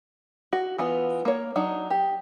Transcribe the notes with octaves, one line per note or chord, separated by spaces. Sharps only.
F#4
E3 B3 F4
A#3 C#5
F#3 D4 D#4
G4